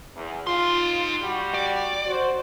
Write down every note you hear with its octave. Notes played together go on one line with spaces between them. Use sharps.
E2
D#4 F4 C6
G3 F#4
D5
F#4 C5